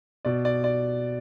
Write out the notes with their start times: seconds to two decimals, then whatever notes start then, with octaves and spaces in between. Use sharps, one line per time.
0.25 B2 D5
0.45 D5
0.64 D5